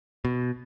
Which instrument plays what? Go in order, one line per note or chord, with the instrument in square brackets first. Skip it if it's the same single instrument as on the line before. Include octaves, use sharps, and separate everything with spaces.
[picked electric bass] B2